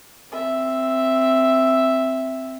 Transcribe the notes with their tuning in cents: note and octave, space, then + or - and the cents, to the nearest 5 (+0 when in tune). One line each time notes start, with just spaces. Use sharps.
C4 +0 E5 +0